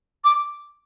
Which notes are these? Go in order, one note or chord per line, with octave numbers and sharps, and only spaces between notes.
D6